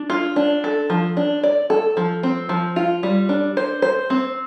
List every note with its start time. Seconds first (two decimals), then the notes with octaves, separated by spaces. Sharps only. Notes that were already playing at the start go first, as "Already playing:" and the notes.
Already playing: D4
0.10 F4
0.36 D4
0.64 A4
0.90 F3
1.17 D4
1.43 D5
1.70 A4
1.97 F3
2.23 C4
2.49 F3
2.76 F4
3.03 G3
3.29 D4
3.57 C5
3.82 C5
4.10 C4